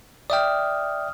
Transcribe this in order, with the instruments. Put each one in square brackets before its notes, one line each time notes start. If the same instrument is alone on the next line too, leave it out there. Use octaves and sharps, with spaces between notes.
[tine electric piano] D5 E5 G5 [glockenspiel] D#6 F6